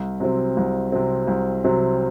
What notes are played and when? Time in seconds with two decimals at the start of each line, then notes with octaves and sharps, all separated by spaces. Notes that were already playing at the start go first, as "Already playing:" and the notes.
Already playing: C2
0.20 C3 F#3 C4
0.57 C2
0.92 C3 F#3 C4
1.27 C2
1.64 C3 F#3 C4